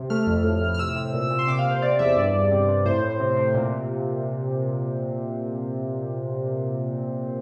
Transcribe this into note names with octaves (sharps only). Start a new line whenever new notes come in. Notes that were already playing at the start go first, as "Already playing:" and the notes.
Already playing: C3
A3 F6
F2
A2
A2
F6
C3 E6
C3
A#2
A#2
C6
C3 D6
F5
C3
C5
C4 D5
E2 E5
G2 D5
G2
C3
C3
A2 C5
A2
C3
C3
A#2
A#2